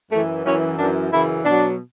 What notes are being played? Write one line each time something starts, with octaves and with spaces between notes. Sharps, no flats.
F#2 E3 A3
F#2 E3 C#4
F#2 E3 D4
F#2 C#3 E3 E4
B2 F#3 D4